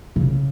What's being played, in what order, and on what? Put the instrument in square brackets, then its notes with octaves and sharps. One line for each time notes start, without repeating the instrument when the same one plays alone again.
[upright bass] C#3